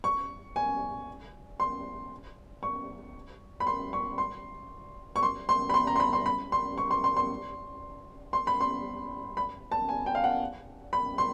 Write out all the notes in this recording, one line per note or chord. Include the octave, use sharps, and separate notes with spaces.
C#6
G#5
C6
C#6
B5
C6
C#6
C6
C#6
C6
C6
B5
C6
A#5
C6
B5
C6
B5
C6
C#6
C6
C6
C6
C6
B5
C6
B5
A5
G#5
G5
F5
F#5
B5
C6